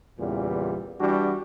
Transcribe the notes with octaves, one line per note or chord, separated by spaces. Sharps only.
E2 A#2 C#3 E3 G3
E3 G3 D4 F#4